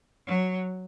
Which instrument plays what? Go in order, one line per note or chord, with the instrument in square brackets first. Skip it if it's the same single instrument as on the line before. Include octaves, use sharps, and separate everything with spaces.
[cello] F#3